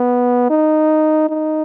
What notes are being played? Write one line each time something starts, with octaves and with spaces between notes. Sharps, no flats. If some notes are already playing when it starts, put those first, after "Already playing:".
Already playing: B3
D#4
D#4